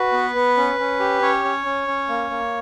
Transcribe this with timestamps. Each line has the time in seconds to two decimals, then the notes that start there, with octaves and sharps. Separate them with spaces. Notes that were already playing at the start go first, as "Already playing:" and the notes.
Already playing: F#4 B4
0.13 B3
0.35 B3
0.57 C#4
0.79 C#4
1.00 G4
1.22 C#4 C#5
1.45 C#4
1.66 C#4
1.88 C#4
2.09 A#3
2.30 A#3